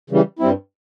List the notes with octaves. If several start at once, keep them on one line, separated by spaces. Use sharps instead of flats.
C#3 E3 G3
G2 G3 C4 E4